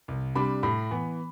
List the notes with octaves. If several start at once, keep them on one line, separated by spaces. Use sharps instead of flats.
C2
C3 G3 D4 B5
A2 B5
E3 B3